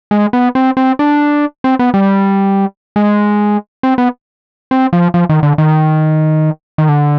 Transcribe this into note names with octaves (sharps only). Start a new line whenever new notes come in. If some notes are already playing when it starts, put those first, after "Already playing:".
G#3
B3
C4
C4
D4
C4
B3
G3
G#3
C4
B3
C4
F3
F3
D#3
D3
D#3
D#3
D3